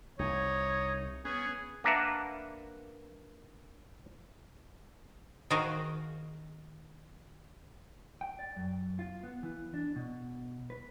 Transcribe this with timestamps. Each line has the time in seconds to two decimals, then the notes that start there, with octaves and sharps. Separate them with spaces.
0.19 C2 D#4 C#5
1.25 B3 C#4 G#4
1.84 A#3 D4 A#4 B4 E5 F#5
5.50 D#3 F#4 G#4 A#4 C5 F5
8.21 G5
8.39 D5
8.56 F#2
8.99 F4
9.23 B3
9.43 E3
9.74 D4
9.96 B2
10.70 B4